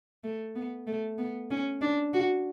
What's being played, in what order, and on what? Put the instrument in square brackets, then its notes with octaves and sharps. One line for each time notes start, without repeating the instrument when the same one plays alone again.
[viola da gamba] A3
B3
A3
B3
C#4
D4
F#4